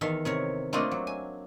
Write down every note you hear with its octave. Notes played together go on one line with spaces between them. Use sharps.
E2 D#3 A4 E5 F5
C3 A#4 C#5
A3 A#3 C4 D4 F4 D#5
F#3
G#5